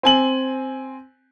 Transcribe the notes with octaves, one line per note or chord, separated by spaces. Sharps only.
C4 G#5 F#7